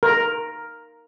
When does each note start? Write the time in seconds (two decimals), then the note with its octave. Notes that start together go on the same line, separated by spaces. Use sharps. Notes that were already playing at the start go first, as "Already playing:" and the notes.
0.03 A#4